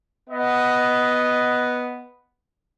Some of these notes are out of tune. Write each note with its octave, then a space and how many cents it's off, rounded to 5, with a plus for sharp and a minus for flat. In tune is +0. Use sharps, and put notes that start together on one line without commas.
B3 +0 D#5 +0